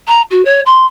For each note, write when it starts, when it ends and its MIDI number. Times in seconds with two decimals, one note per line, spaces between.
0.07 0.22 82
0.30 0.44 66
0.45 0.60 73
0.66 0.86 84